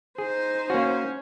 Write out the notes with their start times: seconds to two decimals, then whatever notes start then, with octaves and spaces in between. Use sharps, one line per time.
0.18 D#4 G#4 C5
0.70 A#3 C#4 F#4